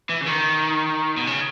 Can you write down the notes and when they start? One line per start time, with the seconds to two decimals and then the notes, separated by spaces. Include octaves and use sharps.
0.10 E3
0.21 C#3
0.27 D#3
1.17 B2
1.27 C#3